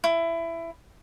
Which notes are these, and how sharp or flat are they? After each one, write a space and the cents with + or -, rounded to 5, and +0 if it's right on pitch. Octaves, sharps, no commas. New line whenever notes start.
E4 +15